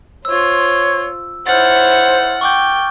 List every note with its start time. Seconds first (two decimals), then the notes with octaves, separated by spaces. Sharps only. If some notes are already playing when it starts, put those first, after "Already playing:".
0.25 F4 C5 C#5 E6
1.47 E4 C5 C#5 F#5 F6 A6
2.41 G5 C#6 D6 G6